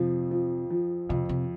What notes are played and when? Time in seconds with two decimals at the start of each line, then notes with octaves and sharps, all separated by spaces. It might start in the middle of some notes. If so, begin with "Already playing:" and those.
Already playing: F2 C3 F3
0.31 F3
0.70 F3
1.09 F2 C3
1.29 C3